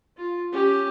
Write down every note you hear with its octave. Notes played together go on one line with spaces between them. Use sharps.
F4
C#4 G4